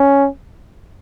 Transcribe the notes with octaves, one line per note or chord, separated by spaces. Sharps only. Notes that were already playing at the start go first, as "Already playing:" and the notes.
Already playing: C#4